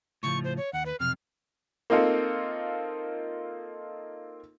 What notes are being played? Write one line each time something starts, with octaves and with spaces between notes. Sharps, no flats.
A2 C#3 F3 C#6
C5
C#5
D#2 F#5
B4
B1 F2 C3 F6
A#3 C4 D#4 F4 A4